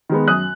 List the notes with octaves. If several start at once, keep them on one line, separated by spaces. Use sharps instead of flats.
D#3 G#3 B3
F#2 D#6 F#6